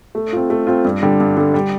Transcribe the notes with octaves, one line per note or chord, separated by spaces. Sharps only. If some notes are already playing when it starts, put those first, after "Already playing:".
A3
C4 F4
A3
C4 F4
G2
D3 G3
G2
D3 G3
G3